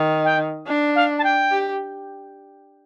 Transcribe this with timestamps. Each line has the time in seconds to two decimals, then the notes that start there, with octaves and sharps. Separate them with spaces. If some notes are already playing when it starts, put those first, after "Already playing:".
Already playing: D#3
0.24 G5
0.67 D4
0.95 F5
1.18 A5
1.23 G5
1.51 G4